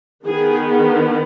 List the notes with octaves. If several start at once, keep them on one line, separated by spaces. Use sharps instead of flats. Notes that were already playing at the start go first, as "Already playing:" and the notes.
D#3 B3 G#4